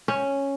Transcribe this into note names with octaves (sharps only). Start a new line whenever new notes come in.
C#4